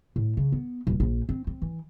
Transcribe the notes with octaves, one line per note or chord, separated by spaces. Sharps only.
A2
C#3
B3
D#1
A#1
C4
C4
E3